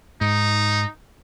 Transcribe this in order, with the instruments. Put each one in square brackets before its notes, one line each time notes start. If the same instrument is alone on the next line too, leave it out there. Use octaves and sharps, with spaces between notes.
[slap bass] G#2 [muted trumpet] D#4